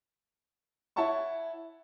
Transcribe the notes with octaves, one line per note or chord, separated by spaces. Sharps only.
E4 C#5 F#5 A5 C#6